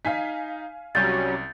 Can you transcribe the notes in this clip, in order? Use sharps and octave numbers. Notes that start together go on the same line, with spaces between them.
D#4 F5 G#5 B6
C2 F#3 G3 C#4 G6 A6